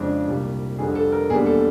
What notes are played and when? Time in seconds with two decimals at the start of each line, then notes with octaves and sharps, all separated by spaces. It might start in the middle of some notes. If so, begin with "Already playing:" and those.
Already playing: F2 C#3 F3 G#3 D4
0.28 C2 A#2 G3
0.78 F2 D3 G3 G#4
0.95 A4
1.12 A#4
1.30 E1 D#2 D3 G3 G#4
1.46 A4